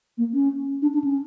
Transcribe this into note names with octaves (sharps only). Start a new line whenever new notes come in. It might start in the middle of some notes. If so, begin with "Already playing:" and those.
A#3
C#4
D4
D4
C#4